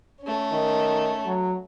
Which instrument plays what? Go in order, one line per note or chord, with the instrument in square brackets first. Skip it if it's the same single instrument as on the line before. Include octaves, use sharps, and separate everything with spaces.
[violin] A3 C#4
[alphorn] D#3
F#3